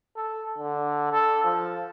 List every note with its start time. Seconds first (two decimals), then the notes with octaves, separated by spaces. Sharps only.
0.17 A4
0.58 D3
1.13 A4
1.44 F3